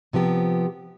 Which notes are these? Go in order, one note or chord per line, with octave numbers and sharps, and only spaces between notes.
C3 F3 B3 G4